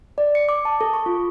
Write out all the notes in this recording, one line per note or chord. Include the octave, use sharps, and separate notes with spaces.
D5
C#7
D6
A5
A4
C#6
F4